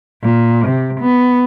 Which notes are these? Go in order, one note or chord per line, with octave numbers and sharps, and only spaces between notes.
A#2
C3
B3